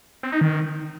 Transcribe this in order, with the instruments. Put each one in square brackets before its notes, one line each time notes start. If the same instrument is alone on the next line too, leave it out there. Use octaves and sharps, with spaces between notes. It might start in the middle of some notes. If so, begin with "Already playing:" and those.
[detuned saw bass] C4
D#4
D#3